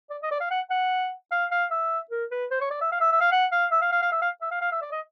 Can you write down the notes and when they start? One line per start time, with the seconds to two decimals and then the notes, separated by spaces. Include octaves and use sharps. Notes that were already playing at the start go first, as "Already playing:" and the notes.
0.10 D5
0.23 D#5
0.31 D5
0.41 F5
0.51 F#5
0.70 F#5
1.32 F5
1.51 F5
1.71 E5
2.11 A#4
2.32 B4
2.51 C5
2.61 C#5
2.71 D5
2.81 E5
2.92 F5
3.01 E5
3.12 E5
3.21 F5
3.32 F#5
3.52 F5
3.71 E5
3.82 F5
3.92 F5
4.02 F5
4.12 E5
4.22 F5
4.41 E5
4.51 F5
4.61 F5
4.72 E5
4.82 D5
4.91 D#5